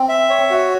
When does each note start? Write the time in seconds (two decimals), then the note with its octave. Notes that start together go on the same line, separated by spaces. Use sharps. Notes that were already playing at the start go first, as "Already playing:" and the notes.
Already playing: C4
0.09 E5
0.30 C#5
0.50 F#4